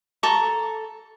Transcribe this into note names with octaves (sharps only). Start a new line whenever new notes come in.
A4 A#5 C#6